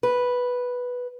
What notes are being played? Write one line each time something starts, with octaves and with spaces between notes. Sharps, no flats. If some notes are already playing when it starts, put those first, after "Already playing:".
B4